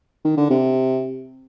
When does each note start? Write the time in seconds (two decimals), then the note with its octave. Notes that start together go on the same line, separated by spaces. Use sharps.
0.25 D#3
0.37 D3
0.50 C3